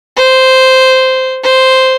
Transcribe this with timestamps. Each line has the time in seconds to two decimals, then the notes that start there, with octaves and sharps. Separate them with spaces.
0.16 C5
1.43 C5